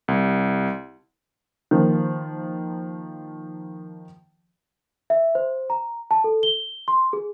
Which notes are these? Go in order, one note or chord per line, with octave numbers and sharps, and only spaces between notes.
C2
D#3 F3 A#3
E5
C5
A#5
A5
A4
G7
C6
G#4